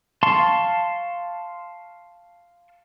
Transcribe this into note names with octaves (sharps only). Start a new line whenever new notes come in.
F5 A5 C6 C#6